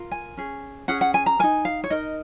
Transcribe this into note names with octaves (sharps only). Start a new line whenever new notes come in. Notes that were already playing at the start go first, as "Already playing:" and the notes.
Already playing: F4 A#4
G#5
C#4 G#4
C#4 G#4 F#5
F#5
G#5
A#5
D#4 A#4 G#5
F5
C#5
D#4 A#4 D#5